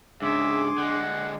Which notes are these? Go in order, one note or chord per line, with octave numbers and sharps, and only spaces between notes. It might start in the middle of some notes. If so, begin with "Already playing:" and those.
G#2 C#3 D4 G#4 E5 C6 D6
D3 G#3 F#5